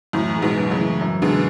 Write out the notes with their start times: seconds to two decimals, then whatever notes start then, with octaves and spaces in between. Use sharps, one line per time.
0.13 F#2 A2 E3
0.36 G#3
0.42 G#2 B2
0.58 F#2
0.71 A2 C#3
0.78 E3
1.01 F#2
1.22 B2 D3 G#3